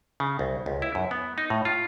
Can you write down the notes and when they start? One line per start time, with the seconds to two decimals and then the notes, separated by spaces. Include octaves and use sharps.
0.20 C#3
0.39 C2
0.66 C#2
0.82 E4
0.95 F#2
1.11 B3
1.38 D#4
1.50 A2
1.65 F4